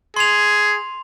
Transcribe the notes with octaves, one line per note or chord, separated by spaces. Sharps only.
G#4 C6 F7